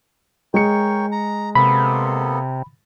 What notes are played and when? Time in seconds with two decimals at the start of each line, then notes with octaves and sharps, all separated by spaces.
0.54 G#3 A#4 C#5 G5 C#7
1.12 A#5
1.55 C3 A#3 B3 A4 B5